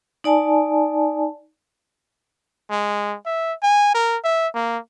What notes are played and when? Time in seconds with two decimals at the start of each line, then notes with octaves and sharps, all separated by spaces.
0.24 D#4 D5 G#5 A5
2.70 G#3
3.26 E5
3.63 G#5
3.95 A#4
4.24 E5
4.54 A#3